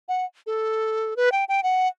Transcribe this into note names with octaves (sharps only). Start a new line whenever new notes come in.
F#5
A4
B4
G5
G5
F#5